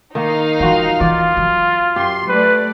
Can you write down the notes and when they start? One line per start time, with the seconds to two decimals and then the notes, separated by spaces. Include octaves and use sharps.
0.15 D#3 A#3 D#4 F5
0.60 E3 G#3 F4 F#4 G5
1.01 E3 F4 D5
1.37 F#3
1.96 F#2 G4 C6
2.29 A3 B4 D5